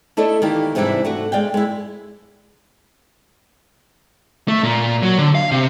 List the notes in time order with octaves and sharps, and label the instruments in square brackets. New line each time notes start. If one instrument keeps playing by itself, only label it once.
[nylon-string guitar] A3 D4 E4 A4 D5 D#5
D#3 E3 A#3 G4
G#2 C3 E3 G3 D4 E4
A3 D4 F#4
G#3 D5 F5 G5
G#3 E4
[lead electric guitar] A3
A#2
F#3
D3
F5
C3